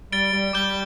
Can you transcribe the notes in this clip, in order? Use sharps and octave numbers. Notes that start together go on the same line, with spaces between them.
G3 A6 D7 G7
G3
G3 D6 G6 D7 G7